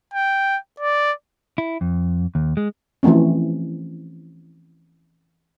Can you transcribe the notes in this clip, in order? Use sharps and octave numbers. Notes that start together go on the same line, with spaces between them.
G5
D5
E4
F2
D#2
G#3
E3 F3 A3 C4 C#4